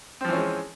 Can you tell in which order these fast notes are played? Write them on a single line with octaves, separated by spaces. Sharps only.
C4 F3 E3 C#4 G#3